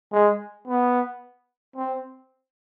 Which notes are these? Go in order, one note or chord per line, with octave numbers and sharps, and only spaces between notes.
G#3
B3
C4